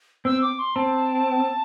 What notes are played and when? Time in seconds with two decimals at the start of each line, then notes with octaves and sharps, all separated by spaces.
0.25 C4 E6
0.42 D6
0.59 C6
0.76 C4 A5